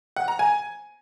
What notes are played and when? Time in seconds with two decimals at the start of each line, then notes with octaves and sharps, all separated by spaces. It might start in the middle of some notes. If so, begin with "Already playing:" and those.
0.16 F#5
0.28 A#5
0.39 G#5